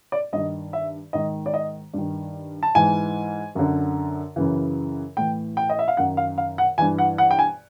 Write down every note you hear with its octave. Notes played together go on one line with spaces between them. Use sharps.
D5
G2 D#3 D#5
E5
G#2 D#3 D#5
D5
D#5
G2 D#3
A5
G#2 E3 G#5
F#2 D3
F#2 C#3 E3
A2 E3 G5
G5
D#5
E5
F5
F#2 D#3 F#5
F5
F5
F#5
G2 E3 G#5
F#5
F#5
G5
G#5